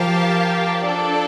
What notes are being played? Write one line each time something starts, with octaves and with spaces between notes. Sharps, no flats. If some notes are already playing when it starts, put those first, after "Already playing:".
Already playing: F3 G4 A#4 F5 A5
D4 A4 D5